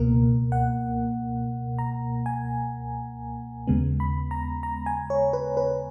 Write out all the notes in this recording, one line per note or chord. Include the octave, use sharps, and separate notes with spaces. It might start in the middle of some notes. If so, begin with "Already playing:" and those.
Already playing: C#2 B2 A#3 A#4
F#5
A#5
G#5
D#2 C#3 G#3 B3
B5
A#5
A#5
G#5
C#5
B4
B4